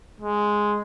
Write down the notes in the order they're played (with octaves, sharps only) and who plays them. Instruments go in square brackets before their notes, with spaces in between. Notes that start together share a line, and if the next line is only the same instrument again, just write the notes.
[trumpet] G#3